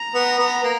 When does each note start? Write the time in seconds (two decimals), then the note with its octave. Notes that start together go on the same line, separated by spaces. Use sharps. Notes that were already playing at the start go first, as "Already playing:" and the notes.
Already playing: A#5
0.14 B3
0.39 B3
0.64 A#3